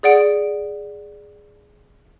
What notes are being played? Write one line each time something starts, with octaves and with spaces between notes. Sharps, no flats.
G#4 D5 F#5 D7